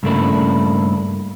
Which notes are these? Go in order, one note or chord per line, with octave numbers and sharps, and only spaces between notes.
G2 C#3 A3 A#3 D4 E4